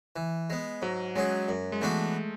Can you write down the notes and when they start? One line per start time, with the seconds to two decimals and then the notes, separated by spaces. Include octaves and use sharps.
0.16 E3
0.50 G#3 B3
0.82 G#2 F#3
1.16 F#3 G#3 C#4 G#4
1.49 F#2
1.72 G#3
1.81 E3 A3 B3 D4 F#4